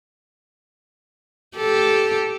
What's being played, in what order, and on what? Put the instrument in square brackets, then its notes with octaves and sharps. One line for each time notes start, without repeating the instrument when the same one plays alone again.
[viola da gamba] G4 A4